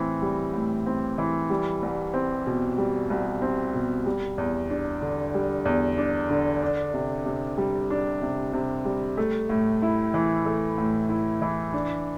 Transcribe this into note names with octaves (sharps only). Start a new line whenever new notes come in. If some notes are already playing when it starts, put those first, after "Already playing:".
Already playing: A2 E3 C4
G3
A2
C4
E3
G3
C2
C4
B2
G3
C2
C4
B2
G3
E2
D4
D3
G3
E2
D4
D3
D4
C3
C3
G3
D4
C3
C3
G3
A3
A2
E4
E3
A3
A2
E4
E3
D4